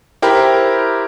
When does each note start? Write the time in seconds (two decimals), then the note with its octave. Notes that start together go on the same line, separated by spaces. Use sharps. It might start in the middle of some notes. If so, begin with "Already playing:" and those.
0.22 E4 G4 A#4 C5 G5 B5